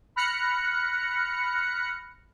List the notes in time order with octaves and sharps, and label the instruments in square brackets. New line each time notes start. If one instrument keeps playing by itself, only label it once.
[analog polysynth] B5 F6 F#6 A#6 C#7